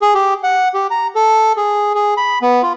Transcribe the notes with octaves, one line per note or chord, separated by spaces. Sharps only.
G#4
G4
F#5
G4
A#5
A4
G#4
G#4
B5
B3
F4